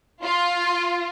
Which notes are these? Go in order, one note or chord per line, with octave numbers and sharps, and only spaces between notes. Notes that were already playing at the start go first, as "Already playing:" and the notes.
F4